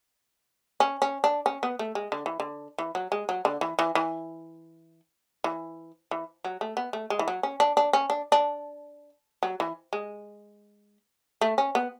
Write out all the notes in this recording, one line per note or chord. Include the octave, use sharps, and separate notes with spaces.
C#4
C#4
D4
C#4
B3
A3
G#3
D3
E3
D3
E3
F#3
G#3
F#3
D3
E3
E3
E3
E3
E3
F#3
A3
B3
A3
G#3
E3
F#3
C#4
D4
D4
C#4
D4
D4
F#3
E3
G#3
A3
C#4
B3